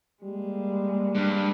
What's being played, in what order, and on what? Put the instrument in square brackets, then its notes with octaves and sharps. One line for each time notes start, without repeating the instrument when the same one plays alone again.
[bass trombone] G3 [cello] G#3 A#3
[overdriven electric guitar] G2